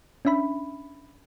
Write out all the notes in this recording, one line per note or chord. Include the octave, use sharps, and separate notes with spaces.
C#4 D4 E5 B5